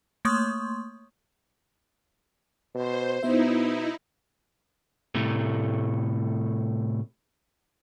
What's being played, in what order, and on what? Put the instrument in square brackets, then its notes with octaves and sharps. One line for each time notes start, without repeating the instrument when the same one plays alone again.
[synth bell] A3 A#3 C#5 C6 C#6 D#6
[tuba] B2 [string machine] C5
[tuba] B2 [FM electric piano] B3 C5 E5 [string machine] D#4 E4
[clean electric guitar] A2 C3 A3